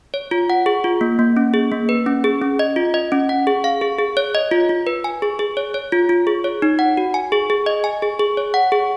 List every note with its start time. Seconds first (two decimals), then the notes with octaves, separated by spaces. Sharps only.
0.14 C#5
0.31 F4
0.50 F#5
0.66 G#4
0.84 F4
1.01 A#3
1.19 A#3
1.37 C#4
1.54 G#4
1.72 A#3
1.89 B4
2.06 C#4
2.24 G#4
2.42 C#4
2.59 D#5
2.76 F4
2.94 D#5
3.12 C#4
3.29 F#5
3.47 G#4
3.64 F5
3.81 G#4
3.99 G#4
4.17 C#5
4.35 D#5
4.51 F4
4.69 F4
4.87 B4
5.04 G#5
5.22 G#4
5.39 G#4
5.57 C#5
5.74 C#5
5.92 F4
6.09 F4
6.27 G#4
6.44 C#5
6.62 D#4
6.79 F#5
6.97 F#4
7.14 G#5
7.32 G#4
7.50 G#4
7.66 D#5
7.84 G#5
8.02 G#4
8.19 G#4
8.37 C#5
8.54 F#5
8.72 G#4